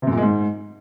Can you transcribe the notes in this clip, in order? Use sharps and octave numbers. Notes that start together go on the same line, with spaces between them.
C3
F#2
A#2
G#3
G#2